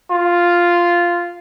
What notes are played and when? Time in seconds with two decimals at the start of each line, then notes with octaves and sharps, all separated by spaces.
0.11 F4